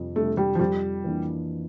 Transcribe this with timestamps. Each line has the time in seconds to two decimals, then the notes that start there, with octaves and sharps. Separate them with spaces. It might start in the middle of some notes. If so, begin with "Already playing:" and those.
Already playing: F2 C3 G3 D4
0.16 C3 G3 A3 D4
0.37 G3
0.55 F3
0.59 F2 G3
1.04 E3 A#3 D4